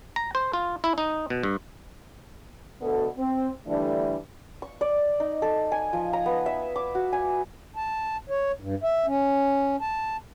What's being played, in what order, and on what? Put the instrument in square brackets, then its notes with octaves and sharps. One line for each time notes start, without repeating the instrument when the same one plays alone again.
[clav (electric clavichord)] A#5
C5
F4
E4
D#4
B2
G2
[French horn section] D2 B2 D3 B3 A4
C4
D3 E3 G3 A3 D4
[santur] C#6
D5
D#4
A4
G#5
F3
A#5
B3
E5
D6
F#4
G#5
[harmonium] A5
C#5
G2
E5
C#4
A5